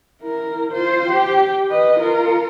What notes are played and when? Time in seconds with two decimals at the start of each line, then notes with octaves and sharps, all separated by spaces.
0.21 E4 A#4
0.72 F4 C5
1.10 G4
1.70 B4 D#5
1.99 F4 A#4